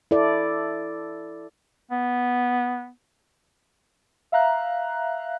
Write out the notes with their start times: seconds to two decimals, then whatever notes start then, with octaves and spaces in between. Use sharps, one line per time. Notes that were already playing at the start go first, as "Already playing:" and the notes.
0.11 E4 A4 D5
1.91 B3
4.32 E5 F5 A#5 F#6